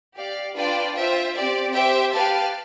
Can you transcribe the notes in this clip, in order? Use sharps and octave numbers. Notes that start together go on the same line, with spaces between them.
G4 D5 F5
D4 F4 B4 D5 G5
F4 C5 E5 G5
C4 G4 D5
G4 C5 E5 G5
G4 B4 F5 A5